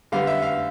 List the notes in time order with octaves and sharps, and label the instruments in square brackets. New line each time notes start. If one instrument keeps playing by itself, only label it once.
[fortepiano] D3 G3 B3 F5
E5
F5